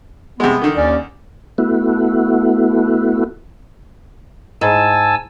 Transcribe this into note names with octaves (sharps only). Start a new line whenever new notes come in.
C3 G#3 B3
D3 D#3
D#2 C#4 D5
A3 B3 E4 F#4
G#2 G#5 A5 E6